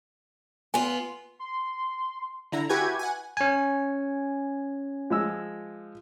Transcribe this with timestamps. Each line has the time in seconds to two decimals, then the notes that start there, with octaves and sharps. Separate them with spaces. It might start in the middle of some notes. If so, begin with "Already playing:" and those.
0.74 B3 F4 G#5
1.39 C6
2.52 D3 E4 A#5
2.69 E4 F#4 G4 B4 G#5 G#6
2.99 F#5 G#5
3.37 C#4 G#5
5.10 F3 G#3 E6